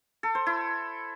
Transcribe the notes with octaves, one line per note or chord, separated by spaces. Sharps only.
A4
C5
E4